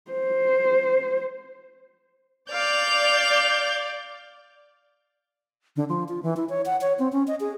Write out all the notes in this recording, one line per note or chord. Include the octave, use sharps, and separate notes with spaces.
C5
D5 F5 G6 F7
D3
F3
F4
E3
E4
C#5
F#5
C#5
C4
C#4
D#5
G#4